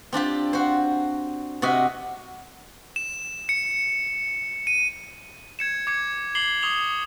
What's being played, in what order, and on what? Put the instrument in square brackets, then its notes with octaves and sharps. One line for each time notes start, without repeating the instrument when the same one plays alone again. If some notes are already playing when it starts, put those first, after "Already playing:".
[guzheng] C4 D4 F4 G4
F#4 C5
C3 F#4 D#5 E5
[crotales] E7
C#7
D#7
G#6 C#7 E7
D6 G#6 C#7
D6 C7 F#7 G7
C#6 D#6 F7 G7